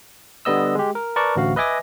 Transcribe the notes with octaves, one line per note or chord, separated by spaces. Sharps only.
D3 G3 B3 D#5 E6
G#3 G4
A#4
A#4 B4 D5 A5 C#6
A1 D2 F#4 F5
B4 D#5 E5 G#5 D6 A#6